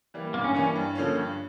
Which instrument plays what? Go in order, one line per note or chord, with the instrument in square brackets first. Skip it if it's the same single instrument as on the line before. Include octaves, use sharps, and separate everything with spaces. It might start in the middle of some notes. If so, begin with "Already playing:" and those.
[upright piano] E3 G3 A#3
[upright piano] G2 [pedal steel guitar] A#3
[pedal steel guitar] C#4
[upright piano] E3 G3 A#3 [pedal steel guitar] C#4
[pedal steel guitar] D4
[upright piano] G2
D3 F3 A#3 C#4
G2